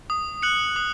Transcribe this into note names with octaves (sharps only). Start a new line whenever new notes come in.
D#6
F#6 C#7 F#7
D#6